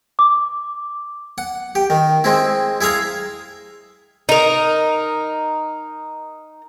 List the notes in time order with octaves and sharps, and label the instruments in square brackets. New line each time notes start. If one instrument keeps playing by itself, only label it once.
[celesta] D6
[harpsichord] F#5
G4
D#3
G#3 C4 E4
E4 G#4 E5 F5 A#5
[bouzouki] D#4 A#4